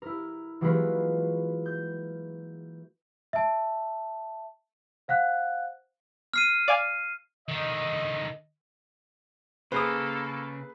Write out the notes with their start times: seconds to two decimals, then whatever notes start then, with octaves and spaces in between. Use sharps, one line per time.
0.02 E4 A#4
0.61 E3 F#3 G#3 A#3 F4 B4
1.66 G6
3.33 E5 A5
5.08 C5 F5 F#5 F#6
6.34 F6 C7 D#7
6.68 D5 F5 G#5
7.49 D3 D#3 D#5
9.72 C#3 A#3 G#4 A4 B4 C5 D#6